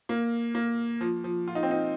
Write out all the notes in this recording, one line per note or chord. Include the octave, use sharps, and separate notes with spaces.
A#3
A#3
F3
F3
F4
D#4
C4
D#4